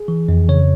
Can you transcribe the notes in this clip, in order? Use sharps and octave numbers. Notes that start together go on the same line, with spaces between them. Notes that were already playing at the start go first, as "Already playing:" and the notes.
Already playing: G#4
E3
F2
C#3 C#5